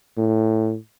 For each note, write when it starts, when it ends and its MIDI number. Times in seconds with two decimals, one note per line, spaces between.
0.17 0.76 45